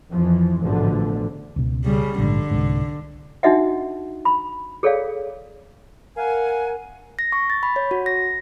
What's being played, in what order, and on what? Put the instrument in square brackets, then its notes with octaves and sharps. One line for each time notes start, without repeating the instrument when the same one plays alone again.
[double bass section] F2 E3 F3
A1 G#2 B2 D3 F3 A3
[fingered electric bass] C#2 B2
[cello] C#3 G3
[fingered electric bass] A#1 G#2 [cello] D3
[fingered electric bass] C2 G#2
[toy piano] D4 D#4 F#4 D#5 E5 F#5
B5
G#4 A4 C#5 D5 F5
[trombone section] A#4 [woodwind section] F5 F#5 G#5
[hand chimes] A#6
C#6
A6
B5
C#5
F#4
A#6